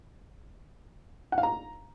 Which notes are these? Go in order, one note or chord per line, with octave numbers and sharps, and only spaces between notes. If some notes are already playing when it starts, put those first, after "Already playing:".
F#5
F5
A#5